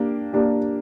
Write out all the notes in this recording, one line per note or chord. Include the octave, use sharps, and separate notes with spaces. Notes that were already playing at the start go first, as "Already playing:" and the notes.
Already playing: A#3 D4 G4
A#3 D4 G4